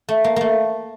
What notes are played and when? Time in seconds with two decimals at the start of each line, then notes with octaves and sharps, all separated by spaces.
0.09 A3
0.24 A#3
0.36 A3 A#3